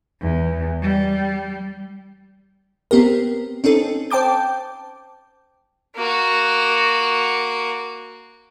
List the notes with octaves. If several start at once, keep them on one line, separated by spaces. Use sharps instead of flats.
E2
G3
B3 C4 G4 A#4
C4 C#4 D#4 A4
C5 G5 A5 D6 G6
A#3 F#4